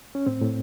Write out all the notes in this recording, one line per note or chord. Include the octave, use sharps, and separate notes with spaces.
C#4
A2 C4
A2